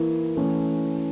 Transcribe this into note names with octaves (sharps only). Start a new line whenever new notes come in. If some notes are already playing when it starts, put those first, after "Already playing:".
Already playing: E3 A#3 E4
E3 A3 C#4